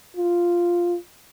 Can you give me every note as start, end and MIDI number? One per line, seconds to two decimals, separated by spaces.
0.16 0.96 65